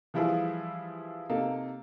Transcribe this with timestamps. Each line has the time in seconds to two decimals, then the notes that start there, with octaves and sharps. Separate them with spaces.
0.14 E3 F3 G3 E4 F4 G#4
1.29 C3 A#3 D#4 A4